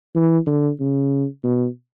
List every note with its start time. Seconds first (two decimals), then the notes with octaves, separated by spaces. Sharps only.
0.16 E3
0.47 D3
0.80 C#3
1.44 B2